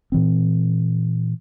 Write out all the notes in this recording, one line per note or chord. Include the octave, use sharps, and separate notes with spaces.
A#2 E3 C4